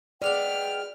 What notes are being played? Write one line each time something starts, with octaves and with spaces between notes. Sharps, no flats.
F#3 G#3 B3 D5 G5 F6